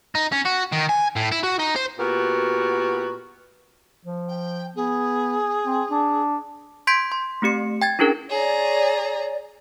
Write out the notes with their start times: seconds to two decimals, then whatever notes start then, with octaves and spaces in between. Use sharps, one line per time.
0.15 D#4
0.32 C#4
0.46 F#4
0.73 D#3
0.89 G#5
1.16 A2
1.32 E4
1.44 F#4
1.59 D#4
1.76 C5
1.99 A#2 B3 F#4 G4 A#4
4.05 F3
4.28 G5
4.76 B3 G#4
5.65 C4
5.91 D4
6.87 C6 G6 G#6 B6 D7
7.12 C6
7.42 A3 C4 G4 C#7
7.82 G5 G#6 A6
7.99 C#4 D4 E4 G#4 A#4
8.30 G#4 C#5 D5 A#5